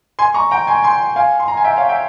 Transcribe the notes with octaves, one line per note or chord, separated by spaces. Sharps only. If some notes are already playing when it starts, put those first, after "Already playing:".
G#5 C6
A#5 C#6
G5 A#5
G#5 C6
G#5 C6
F5 G#5
C6
A#5
G#5
E5 G5
C#5 F5
E5 G5